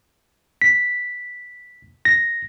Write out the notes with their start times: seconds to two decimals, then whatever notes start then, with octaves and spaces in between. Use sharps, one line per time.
0.62 B6
2.05 A#6